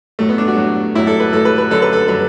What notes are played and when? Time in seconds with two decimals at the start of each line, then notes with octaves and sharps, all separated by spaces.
0.19 A2 F#3 A3
0.29 B3
0.38 D4
0.48 F#4
0.57 A2 F#3
0.95 A2 F#3 E4
1.07 A4
1.20 B4
1.33 A2 F#3 A4
1.45 B4
1.58 B4
1.71 F#2 D3 F#3 A4
1.82 B4
1.93 A4
2.08 D3 F#3 B4